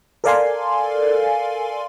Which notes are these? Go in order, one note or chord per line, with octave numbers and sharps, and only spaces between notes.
A4 A#4 D5 F5 G#5 C6